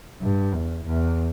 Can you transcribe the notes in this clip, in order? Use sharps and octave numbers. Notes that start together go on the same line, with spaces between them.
G2
E2
E2